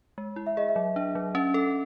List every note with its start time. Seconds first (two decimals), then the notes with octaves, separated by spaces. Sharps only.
0.18 G#3
0.36 E4
0.47 E5
0.57 G#4 D#5
0.69 E5
0.76 F#3
0.96 D4
1.15 F#3
1.35 C#4
1.54 A4